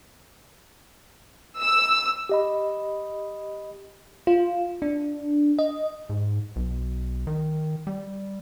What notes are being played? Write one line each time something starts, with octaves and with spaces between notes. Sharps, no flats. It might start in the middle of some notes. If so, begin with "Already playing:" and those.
E6
G4 D#5 B5
F4
D4
D#5
G#2
B1
D#3
G3